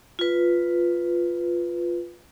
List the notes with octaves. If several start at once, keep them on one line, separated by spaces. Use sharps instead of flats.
F4 B4